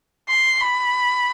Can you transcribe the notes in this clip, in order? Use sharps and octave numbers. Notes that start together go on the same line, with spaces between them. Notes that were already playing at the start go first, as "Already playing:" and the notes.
C6
B5